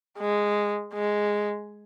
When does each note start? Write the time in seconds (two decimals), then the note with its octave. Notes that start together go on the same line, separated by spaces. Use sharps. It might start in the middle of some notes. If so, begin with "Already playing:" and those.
0.19 G#3
0.94 G#3